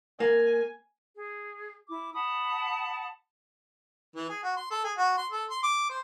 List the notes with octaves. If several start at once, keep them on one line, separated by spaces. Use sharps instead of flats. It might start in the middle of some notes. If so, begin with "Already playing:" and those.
A#3 G#5
G#4
E4 D6
F#5 A5 B5 D#6
E3
G#4
F#4
C6
A4
G#4
F#4
C6
A4
C6
D6
C5